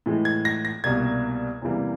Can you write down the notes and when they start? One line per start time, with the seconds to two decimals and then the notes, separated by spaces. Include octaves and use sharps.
0.06 A2 E3 G#3
0.25 G#6
0.45 A#6
0.65 A#6
0.84 C2 B2 G3 A#3 G#6
1.62 E2 C3 E3 G3 A#3